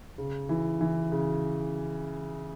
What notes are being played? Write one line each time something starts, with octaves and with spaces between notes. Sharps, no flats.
C#3
E3
E3
C#3